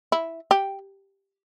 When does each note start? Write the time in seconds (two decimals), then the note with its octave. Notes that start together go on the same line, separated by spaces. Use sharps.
0.12 E4
0.51 G4